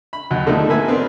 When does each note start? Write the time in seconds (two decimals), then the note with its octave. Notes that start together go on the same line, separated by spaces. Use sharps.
0.13 B5
0.31 D#2 F#3 F#5
0.46 B2 D3 F3 A3 A#3 D#4
0.68 G#1 A#3 B4 E5 G#5
0.88 B3 C4 D4 F4 A#4